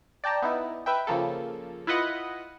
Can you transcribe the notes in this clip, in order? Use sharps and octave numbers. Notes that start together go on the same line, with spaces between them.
D5 G5 A5 A#5
B3 D#4 E4
B4 E5 G5
C#3 F3 A#3 A4
E4 F4 B4 D#5 F#5